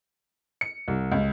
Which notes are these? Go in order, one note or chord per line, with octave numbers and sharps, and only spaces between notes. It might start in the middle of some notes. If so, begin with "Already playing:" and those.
C#7
C2
C#2